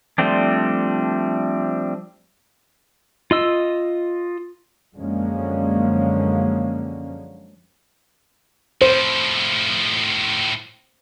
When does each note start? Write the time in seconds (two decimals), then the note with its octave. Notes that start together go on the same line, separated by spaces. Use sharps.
0.18 F3 G3 A3 C4 D4
3.31 F4 D#5 E6
4.95 F#2 D3 F3 G#3 A#3 C#4
8.82 A2 F3 C5